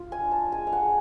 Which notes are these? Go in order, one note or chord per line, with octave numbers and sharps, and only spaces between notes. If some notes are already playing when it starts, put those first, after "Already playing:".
Already playing: F4
G#5
D4
A5
G#3 G#5
F5
F#5
G#3